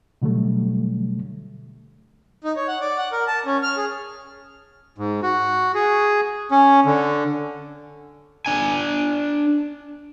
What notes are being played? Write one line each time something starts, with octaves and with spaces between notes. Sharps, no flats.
B2 D3 F#3 G3 A3
D#4
C#5
F#5
D5
F#5
A#4
A5
C#4
F6
G#4
G#2
F#4
G#4
C#4
D3
D4 G#5